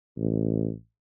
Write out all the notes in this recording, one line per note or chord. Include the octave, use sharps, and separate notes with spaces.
A1